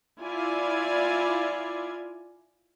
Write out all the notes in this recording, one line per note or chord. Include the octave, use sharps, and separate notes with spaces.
E4 F4 D5 G#5